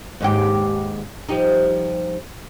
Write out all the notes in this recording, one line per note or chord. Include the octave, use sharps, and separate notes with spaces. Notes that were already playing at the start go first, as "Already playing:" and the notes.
D#2 G#2 G4
F3 G3 D#4